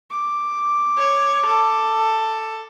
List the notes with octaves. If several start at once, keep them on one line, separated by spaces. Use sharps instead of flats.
D6
C#5
A4